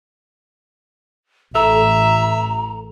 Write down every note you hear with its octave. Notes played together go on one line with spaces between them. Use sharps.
A1 A4 E5 A#5